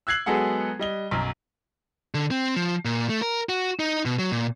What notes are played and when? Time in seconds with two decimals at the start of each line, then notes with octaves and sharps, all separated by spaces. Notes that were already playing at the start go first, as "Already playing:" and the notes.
0.07 E6 F#6 G#6 C7 F#7
0.26 F#3 G#3 B3 G#4 A4 F#5
0.79 G3 D#5 G7
1.11 B1 F#2
2.14 D3
2.31 C4
2.56 F3
2.85 A#2
3.09 A3
3.22 A#4
3.49 F#4
3.80 D#4
4.05 B2
4.19 F#3
4.32 A#2